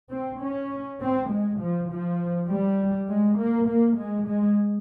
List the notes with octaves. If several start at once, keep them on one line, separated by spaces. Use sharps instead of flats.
C4
C#4
C4
G#3
F3
F3
G3
G#3
A#3
A#3
G#3
G#3